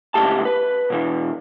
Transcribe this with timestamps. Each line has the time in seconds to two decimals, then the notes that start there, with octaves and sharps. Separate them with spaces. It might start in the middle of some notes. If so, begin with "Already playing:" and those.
0.14 C#2 A2 D#3 G4 A5
0.45 B4
0.90 B2 E3